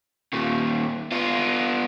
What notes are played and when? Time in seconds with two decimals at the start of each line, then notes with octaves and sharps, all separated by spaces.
0.33 D#2 A#2
1.12 B3 F4